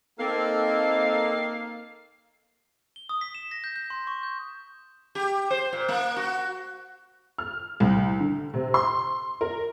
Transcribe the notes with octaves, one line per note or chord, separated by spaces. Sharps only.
A#3 C4 D#4 A4 F5
G7
D#6
B6
E7
A#6
G6
G6
C6
C#6
G6
G4
C5
A#2
A#3
F#4
F6
C2
D3
C3
C6
A#4